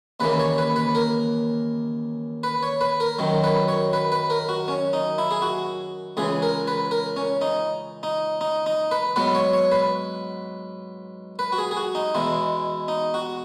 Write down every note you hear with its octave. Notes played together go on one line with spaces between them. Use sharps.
D#2 C#3 E3 A#3 B4
C#5
B4
B4
A#4
B4
C#5
B4
A#4
F#2 D#3 F#3
B4
C#5
B4
B4
A#4
F#4
C#4
D#4
E4
G#4
F#4
C#2 C#3 E3 G#4
A#4
B4
A#4
C#4
D#4
D#4
D#4
D#4
B4
G#2 F#3 B3 B4
C#5
C#5
B4
B4
F#4
G#4
G#4
F#4
D#4
E2 B2 G#3 E4
D#4
F#4